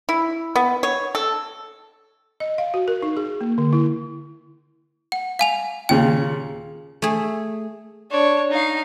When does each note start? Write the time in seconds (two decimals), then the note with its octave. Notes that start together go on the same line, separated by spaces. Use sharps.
0.09 E4
0.56 B3
0.83 C#5
1.15 A4
2.40 D#5
2.58 F5
2.74 F#4
2.88 A#4
3.02 D#4
3.17 G#4
3.41 A#3
3.58 D3
3.73 E4
5.12 F#5
5.39 F5 G#5 F7
5.89 D#2 A#2 C#3 G5
7.02 A3 G#4
8.11 D4 C#5
8.51 D#4 F5